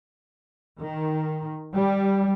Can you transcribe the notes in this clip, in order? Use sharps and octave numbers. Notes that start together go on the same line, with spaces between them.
D#3
G3